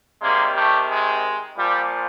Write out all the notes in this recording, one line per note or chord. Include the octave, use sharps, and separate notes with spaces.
C3 D#3 G3 G#3 A#3
G3 A3
G#3
A#2 F3 G3